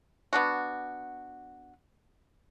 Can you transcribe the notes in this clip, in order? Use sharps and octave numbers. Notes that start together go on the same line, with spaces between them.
B3 D4 F#4